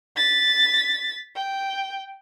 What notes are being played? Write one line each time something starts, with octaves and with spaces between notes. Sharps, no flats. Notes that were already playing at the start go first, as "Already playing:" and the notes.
A6 B6
G5